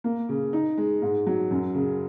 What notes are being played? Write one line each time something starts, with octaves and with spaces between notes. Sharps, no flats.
A#3
C#3
D#4
G#3
G#2
F#3
F#2
C#3